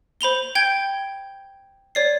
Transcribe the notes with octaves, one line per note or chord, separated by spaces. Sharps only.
C5 B5 F7 G7
G5 G6 G#6 G7
C#5 D5 C7